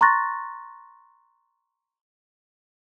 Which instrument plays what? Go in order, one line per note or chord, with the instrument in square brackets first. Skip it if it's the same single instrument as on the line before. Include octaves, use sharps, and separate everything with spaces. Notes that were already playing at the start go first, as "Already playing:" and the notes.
[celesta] A#5 C6 C#6 F#6 A6 A#6